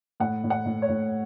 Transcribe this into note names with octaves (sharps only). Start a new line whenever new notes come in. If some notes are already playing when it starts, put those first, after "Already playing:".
A2 F#5
A2
F#5
A2
C#5
A2